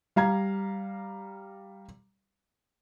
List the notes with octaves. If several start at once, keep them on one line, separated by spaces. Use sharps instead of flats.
G3 F5 A#5 G#6